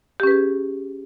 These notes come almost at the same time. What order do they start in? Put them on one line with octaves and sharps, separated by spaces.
G4 C#4 B4 G#4